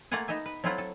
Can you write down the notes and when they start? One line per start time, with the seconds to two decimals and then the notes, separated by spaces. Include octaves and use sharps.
0.11 A3 A#3 F4 F5 F#5 G#5
0.28 B3 D#4 D#5 E5 G#5
0.46 B4
0.64 F#3 A3 C4 E4 F4 F#5
0.78 A4